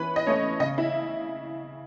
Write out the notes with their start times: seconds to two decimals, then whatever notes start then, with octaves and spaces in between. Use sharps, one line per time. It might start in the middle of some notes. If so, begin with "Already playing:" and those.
Already playing: E3 C#4 B4 B5
0.16 D#5
0.26 A3 C#4 C#5
0.60 C#3 D#5
0.78 E4 E5